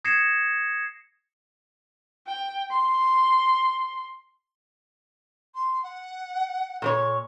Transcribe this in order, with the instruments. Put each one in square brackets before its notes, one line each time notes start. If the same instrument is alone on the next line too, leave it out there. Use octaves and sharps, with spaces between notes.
[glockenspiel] D#6 G#6 A#6 C7 C#7 E7
[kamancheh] G5
C6
[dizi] C6
F#5
[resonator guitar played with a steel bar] A#2 B4 C#5